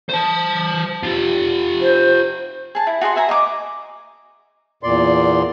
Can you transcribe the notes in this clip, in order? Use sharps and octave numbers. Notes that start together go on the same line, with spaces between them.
C5 A5
F4 G4
C5
G#4 A5
E4
F#4 G#4 D#5 C6
B4 E5 G#5 A#5
D#5 A#5 D6
E2 A#2 D5 C6